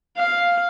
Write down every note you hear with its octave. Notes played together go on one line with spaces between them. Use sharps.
F5